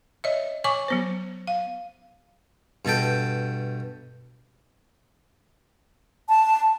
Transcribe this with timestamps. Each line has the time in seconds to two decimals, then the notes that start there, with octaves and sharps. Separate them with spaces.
0.24 C#5 D#5 E5
0.64 C#5 G#5 C#6 D6
0.88 F#3 B3 C5
1.47 F5
2.85 G2 B2 A4 G5
6.29 A5